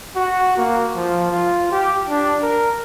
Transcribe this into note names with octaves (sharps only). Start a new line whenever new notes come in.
F#4
A#3
F3
F4
G4
D4
A#4